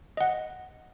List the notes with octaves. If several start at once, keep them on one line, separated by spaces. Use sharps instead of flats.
D#5 F#5